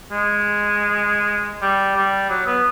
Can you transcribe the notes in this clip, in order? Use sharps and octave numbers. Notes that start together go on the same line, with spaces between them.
G#3
G3
G3
F#3
B3